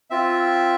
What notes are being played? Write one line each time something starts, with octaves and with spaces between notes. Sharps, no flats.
C4 F4 E5